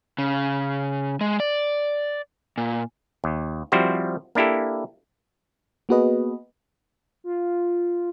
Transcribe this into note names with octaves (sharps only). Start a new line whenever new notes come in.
C#3
G#3
D5
A#2
D#2
F3 G3 C4 E4 F#4 C5
A#3 D4 E4 G4 A4
A#3 B3 F#4 G#4 B4 D#5
F4